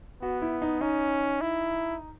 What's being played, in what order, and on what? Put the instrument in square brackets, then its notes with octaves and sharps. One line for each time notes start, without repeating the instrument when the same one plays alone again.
[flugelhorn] B3 [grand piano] F#4
[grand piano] E4
D#4
[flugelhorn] C#4 [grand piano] D#4
[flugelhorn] E4